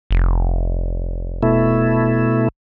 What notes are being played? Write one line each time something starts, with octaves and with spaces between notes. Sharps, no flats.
F1
B2 A3 E4